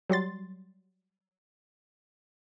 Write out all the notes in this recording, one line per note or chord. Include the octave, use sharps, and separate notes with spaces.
F#3 G3 C6 A6